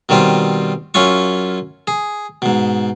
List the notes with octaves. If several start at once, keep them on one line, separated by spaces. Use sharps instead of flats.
B2 D#3 G3 C4 F4
F#2 C#4 E4 F4 C#6
G#4
G#2 B2